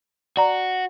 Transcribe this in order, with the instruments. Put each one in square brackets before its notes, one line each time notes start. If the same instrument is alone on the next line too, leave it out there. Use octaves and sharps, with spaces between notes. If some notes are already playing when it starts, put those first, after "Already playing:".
[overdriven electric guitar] F#4 [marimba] D5 A#5